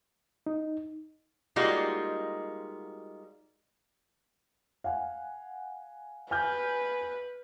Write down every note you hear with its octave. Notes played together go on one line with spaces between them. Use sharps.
D#4
G3 G#3 A#3 D#4 F4 F#4
F5 F#5 G#5
B4 G#5 F6 G6